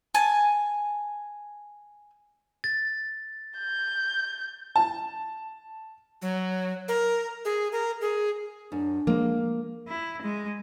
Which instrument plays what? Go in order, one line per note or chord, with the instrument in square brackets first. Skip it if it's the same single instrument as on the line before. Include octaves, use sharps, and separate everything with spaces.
[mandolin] G#5 A5
[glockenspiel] A6
[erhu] G6
[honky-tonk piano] A5
[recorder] F#3
A#4
G#4
A#4
G#4
[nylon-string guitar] F#2 [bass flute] D4
[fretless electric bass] F3 G#3 [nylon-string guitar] A#3
[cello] E4
G#3